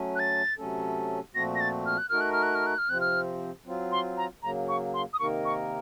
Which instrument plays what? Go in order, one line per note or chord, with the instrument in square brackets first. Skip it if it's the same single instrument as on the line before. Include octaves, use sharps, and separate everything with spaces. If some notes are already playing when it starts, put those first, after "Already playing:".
Already playing: [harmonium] F#3 A3 C#4
[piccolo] F#6
A6
[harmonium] C3 F#3 A3 C#4 A4
[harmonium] A#2 F3 A3 C4 F#4 [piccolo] A#6
[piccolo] A#6
A6
F6
F#6
[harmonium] A3 D#4 F#4 A#4 [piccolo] F6
[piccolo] F#6
F6
F#6
F6
F#6
F6
[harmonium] C3 F3 C4 [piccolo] F#6
[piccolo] F6
[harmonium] F#3 C4 F4
[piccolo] C6
A#5
[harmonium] C#3 F#3 A#3 [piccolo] A#5
[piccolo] C#6
C6
D#6
[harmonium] C3 D#3 A#3 D#4 A#4 [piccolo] C#6
[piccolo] C#6